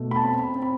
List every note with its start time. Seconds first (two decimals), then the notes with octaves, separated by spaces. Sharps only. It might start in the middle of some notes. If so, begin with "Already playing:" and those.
Already playing: B2 A3
0.11 B5
0.16 A5
0.24 C4
0.39 B5
0.55 C4
0.62 B5